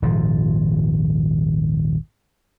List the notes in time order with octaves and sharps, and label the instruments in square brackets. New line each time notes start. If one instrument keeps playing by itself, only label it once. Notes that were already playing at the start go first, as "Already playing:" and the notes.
[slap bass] D#1 G#1 A#2 F3